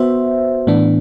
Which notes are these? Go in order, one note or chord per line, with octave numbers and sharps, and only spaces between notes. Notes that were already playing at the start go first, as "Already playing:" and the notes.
Already playing: B3 F#4 C5 E5
A2 E3 B3 D4